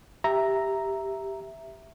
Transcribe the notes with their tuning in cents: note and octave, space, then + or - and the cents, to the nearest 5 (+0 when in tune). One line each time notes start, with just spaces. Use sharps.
G4 +0 E5 +0 A#5 +0